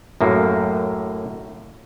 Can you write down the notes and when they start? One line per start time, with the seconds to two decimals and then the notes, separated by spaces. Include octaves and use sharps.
0.21 F#2 A2 A#3